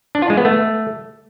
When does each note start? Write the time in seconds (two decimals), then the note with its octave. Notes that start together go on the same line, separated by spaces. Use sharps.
0.15 D4
0.22 F4
0.30 G#3
0.37 B3
0.45 A3